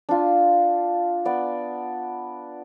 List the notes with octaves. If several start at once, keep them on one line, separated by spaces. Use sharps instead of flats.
D4 F4
B3 D5